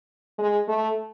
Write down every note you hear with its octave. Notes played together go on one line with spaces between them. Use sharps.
G#3
A3